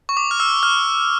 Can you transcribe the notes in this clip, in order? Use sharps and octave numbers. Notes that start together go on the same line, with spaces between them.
C#6
D6
F6
E6
F6